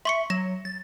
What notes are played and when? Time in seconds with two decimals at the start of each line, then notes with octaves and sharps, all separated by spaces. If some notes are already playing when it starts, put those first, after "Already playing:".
0.05 E5 C6 C#6 C#7
0.30 F#3 A#6 E7
0.65 A6